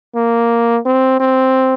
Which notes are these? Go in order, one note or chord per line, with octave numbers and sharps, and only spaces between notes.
A#3
C4
C4